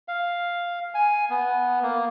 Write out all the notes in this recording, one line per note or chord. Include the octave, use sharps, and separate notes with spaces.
F5
G#5
B3
A#3